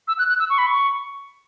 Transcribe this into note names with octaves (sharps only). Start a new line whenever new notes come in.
E6
F#6
F#6
E6
C#6
B5
C#6